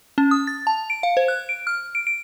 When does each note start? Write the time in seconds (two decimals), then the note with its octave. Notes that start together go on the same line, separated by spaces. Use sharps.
0.18 C#4
0.31 D#6
0.47 A6
0.67 A5
0.90 D7
1.03 F5
1.17 C5
1.28 F#6
1.49 D7
1.67 F6
1.95 D7
2.07 D7